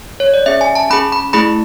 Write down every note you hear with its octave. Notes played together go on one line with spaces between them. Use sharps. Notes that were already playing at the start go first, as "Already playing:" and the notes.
C#5
D5
C#4 G#4 E5
G#5
A5
C#4 G#4 B5
B5
A3 E4 G#4 B5